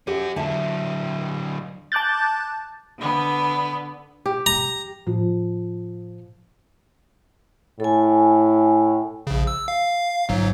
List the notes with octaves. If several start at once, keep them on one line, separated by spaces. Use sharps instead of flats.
C#4 F#4 G4
D3 F#3 E5 A5
A5 D6 F#6 G6 A6
D3 B3
G4
A#5
A2 F3
A2 A4 G#5
A#1 C#3
E6
F5
G1 G#2 F#3